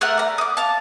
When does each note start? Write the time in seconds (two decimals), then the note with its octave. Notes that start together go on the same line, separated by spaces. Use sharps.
0.01 A3 A#4 F#5 F6
0.18 D5 A#5
0.38 D6 D#6
0.57 F5 A5